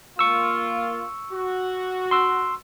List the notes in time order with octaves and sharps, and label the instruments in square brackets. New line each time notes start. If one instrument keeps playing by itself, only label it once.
[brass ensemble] A#3 F4 [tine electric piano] C#6 E6
[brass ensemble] F#4
[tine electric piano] C6 E6